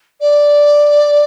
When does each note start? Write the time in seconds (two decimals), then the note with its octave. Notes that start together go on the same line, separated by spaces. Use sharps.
0.20 D5